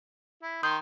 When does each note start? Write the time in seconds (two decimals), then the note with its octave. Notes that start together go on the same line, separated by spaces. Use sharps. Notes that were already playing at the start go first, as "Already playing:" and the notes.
0.43 E4
0.63 D#3 C6 D#6 G6